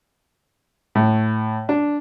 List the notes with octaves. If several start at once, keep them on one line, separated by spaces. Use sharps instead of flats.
A2
D4